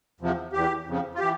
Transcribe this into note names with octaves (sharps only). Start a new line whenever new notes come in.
E2 C3 F3
E2 E3 G4
F2 C#3 F3
F4
E3 G4